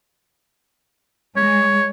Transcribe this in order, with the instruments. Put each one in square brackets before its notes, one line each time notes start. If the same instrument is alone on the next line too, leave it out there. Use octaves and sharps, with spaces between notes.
[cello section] G#3 [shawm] C#5